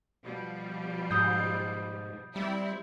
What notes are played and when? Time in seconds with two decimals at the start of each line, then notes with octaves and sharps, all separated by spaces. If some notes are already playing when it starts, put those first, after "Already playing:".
0.24 B2 F3 G3
1.11 G#2 D#6 G6
2.36 G3 C4 E4